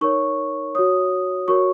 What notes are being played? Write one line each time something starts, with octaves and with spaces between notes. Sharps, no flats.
D#4 A#4 C#5 C#6
F#4 C#5 D#6
F#4 A#4 C#5 C#6